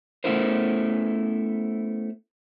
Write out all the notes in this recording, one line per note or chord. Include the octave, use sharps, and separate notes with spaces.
A3 B3 C#4 E4 A#4 C5